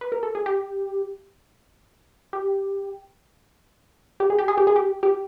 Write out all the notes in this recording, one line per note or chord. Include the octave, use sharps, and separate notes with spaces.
B4
A#4
A4
G#4
G4
G4
G4
G#4
G4
G#4
G4
G#4
G4
G4